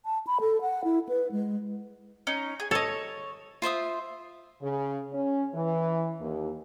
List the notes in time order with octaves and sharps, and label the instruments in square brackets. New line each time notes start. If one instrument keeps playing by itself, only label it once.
[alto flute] A5
B5
A4
F#5
E4
B4
G#3
[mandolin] C#4 D#4
G#4
[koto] A4 D#5 [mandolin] C#5
[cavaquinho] F4 C5 E5 D#6
[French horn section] C#3
C#4
E3
D#2